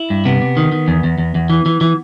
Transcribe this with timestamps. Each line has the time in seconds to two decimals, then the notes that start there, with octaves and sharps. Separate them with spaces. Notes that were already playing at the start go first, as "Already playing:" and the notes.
Already playing: E4
0.10 G2
0.25 C3 B3
0.42 C3
0.57 D#3
0.72 D#3
0.88 E2
1.04 E2
1.18 E2
1.35 E2
1.50 E3
1.66 E3
1.81 E3